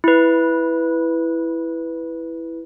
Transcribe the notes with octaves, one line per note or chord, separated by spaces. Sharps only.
E4 B4